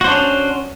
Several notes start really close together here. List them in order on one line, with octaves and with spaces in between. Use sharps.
F#4 C5 D4 C#4